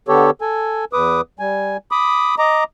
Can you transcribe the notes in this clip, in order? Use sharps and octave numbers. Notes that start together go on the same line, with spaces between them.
D3 B3 G4 A4 C#5
A4 G#5
E2 B4 D6 D#6
G3 G#5
B5 D6 D#6
D#5 A#5 D6